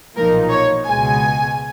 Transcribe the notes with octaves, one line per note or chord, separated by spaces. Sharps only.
B1 A#2 F3 A#3 D#4 A#4
C#5
C#2 B2 G#3 G#5